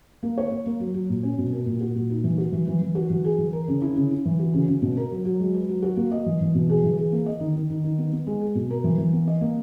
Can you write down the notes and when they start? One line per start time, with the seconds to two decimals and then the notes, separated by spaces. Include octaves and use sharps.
0.23 A#3
0.38 C#5
0.51 A#3
0.66 A#3
0.80 F#3
0.94 F#3
1.09 A#2
1.23 C#4
1.38 B2
1.53 A#4
1.66 A#2
1.81 F#4
1.95 A#2
2.10 D#4
2.24 E3
2.38 F#4
2.52 E3
2.67 E3
2.81 E3
2.95 F#4
3.10 E3
3.24 G#4
3.38 E3
3.53 A#4
3.68 C#3
3.82 E4
3.96 C#3
4.11 E4
4.25 E3
4.39 F#4
4.54 C#3
4.68 C#3
4.82 B2
4.97 A#4
5.11 F#3
5.25 F#3
5.40 G#3
5.54 B4
5.69 F#3
5.82 F#4
5.97 A#3
6.12 D#5
6.26 E3
6.41 E3
6.55 B2
6.70 G#4
6.84 E3
6.97 G#4
7.12 A#3
7.26 D#5
7.40 D#3
7.56 D#3
7.70 D#3
7.84 D#3
7.98 B3
8.12 B3
8.27 G#3
8.41 G#4
8.55 B2
8.70 A#4
8.84 E3
8.98 E3
9.13 B3
9.28 D#5
9.41 A#3